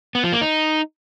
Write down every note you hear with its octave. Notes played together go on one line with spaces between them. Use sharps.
B3
F3
A#3
D#4